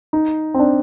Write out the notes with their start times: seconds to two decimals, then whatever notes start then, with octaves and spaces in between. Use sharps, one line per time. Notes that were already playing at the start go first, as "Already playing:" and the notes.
0.13 D#4
0.54 C4
0.59 D4